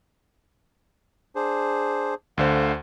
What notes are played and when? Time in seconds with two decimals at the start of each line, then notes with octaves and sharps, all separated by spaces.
1.35 D4 G#4 C5
2.38 D2 D3 C5 F5